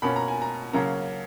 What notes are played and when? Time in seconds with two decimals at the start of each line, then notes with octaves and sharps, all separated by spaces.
0.02 B2 A#3 C#4 B5
0.16 A#5
0.28 G#5
0.42 A#5
0.73 C#3 F#3 A#3 C#4 A#5